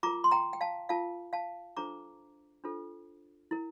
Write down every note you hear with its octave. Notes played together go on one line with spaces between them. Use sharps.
F4 A#4 A#5 D6
C6
G5 A#5
G5
F5 A5
F4 A#4 F5 A5
F5 A5
D4 F4 A4 C5 A#5 D6
D4 F4 A4 C5
E4 A#4